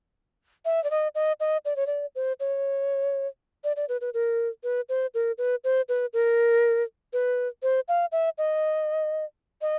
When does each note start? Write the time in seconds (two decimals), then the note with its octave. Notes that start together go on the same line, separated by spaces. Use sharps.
0.65 E5
0.84 D5
0.91 D#5
1.15 D#5
1.40 D#5
1.65 D5
1.76 C#5
1.87 D5
2.15 C5
2.40 C#5
3.64 D5
3.76 D5
3.89 B4
4.01 B4
4.14 A#4
4.64 B4
4.89 C5
5.14 A#4
5.38 B4
5.64 C5
5.89 B4
6.13 A#4
7.13 B4
7.63 C5
7.88 F5
8.12 E5
8.38 D#5
9.62 D#5